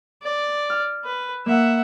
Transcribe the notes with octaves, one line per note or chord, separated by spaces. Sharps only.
D5
F6
B4
A#3 E5 F#5